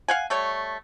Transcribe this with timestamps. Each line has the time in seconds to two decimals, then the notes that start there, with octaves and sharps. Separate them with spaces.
0.08 F5 F#5 G#5
0.30 G3 A3 C#5